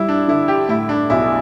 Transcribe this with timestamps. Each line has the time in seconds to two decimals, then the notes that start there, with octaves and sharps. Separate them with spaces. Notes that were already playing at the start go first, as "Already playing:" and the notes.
Already playing: G3 E4
0.08 D4
0.28 D3 E4
0.48 G4
0.69 A2 E4
0.89 D4
1.10 B1 E4